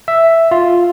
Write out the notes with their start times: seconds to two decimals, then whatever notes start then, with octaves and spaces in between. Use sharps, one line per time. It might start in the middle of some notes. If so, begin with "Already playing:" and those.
0.08 E5
0.51 F4